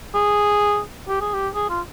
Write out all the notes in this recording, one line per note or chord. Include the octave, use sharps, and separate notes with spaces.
G#4
G4
G#4
G4
G#4
F4